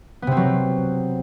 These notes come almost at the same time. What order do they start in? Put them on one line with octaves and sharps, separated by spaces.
B3 C3 C4 F#3